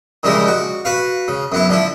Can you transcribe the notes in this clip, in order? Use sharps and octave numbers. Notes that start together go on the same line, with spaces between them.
A#2 C#3 F3 G3 G#3 E4
F#4
F#4 B4 F5
C#3
F#2 B3 E4
D3 F3 E4